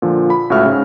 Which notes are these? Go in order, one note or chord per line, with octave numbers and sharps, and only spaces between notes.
A#2 D3 F3
B5
C#2 A2 F#4 E5 F6
G#2 C#3